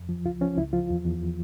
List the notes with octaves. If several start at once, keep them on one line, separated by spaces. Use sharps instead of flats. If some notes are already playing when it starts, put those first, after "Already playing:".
Already playing: F2
F3
C#2 F4
F3 C#4
C#2 E4
F3 F4
E2
E2